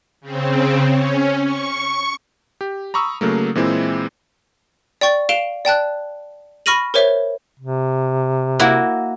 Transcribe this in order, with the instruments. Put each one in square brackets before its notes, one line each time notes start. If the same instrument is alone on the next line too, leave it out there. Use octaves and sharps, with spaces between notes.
[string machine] C#3 C4
C#4
C#6
[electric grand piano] G4
A#5 B5 C#6 D#6 E6
C#3 F#3 A3 A#3
A#2 E3 G#3 C4 E4
[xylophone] D5 G5 C#6 A6
F5 D7 E7 F7 G7
D5 G5 A5 F#6
B5 C#6 F6 A#6 D#7 F#7
A#4 C5 C#5 E5
[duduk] C3
[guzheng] A#3 E4 F#4